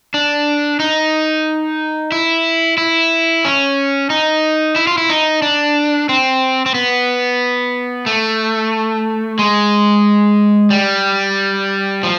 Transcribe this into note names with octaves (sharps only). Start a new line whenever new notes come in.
D4
D#4
E4
E4
C#4
D#4
E4
F4
E4
D#4
D4
C4
C4
B3
A3
G#3
G3
F3